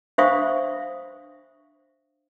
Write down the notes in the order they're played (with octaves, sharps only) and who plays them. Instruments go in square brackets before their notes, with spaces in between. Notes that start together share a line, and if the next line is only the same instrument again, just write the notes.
[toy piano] D4 C5 E5 F5 C#6 D#6